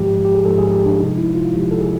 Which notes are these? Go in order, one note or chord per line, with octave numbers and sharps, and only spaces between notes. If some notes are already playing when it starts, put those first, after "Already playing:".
Already playing: G#2 F3 G#3 G4
G4
G#4
G#2 F3 G#3 A4
G#4
G4
D4
C#2 C3 F3 G#3 D#4
E4
F4
C#2 C3 F3 G#3 G4
A4
G#4